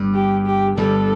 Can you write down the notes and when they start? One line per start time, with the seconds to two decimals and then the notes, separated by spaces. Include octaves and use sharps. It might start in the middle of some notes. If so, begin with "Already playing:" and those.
Already playing: G1 G2 G3
0.15 G4
0.46 G4
0.77 G1 G2 G3 A4